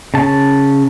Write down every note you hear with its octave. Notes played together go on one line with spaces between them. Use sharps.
C#3 A5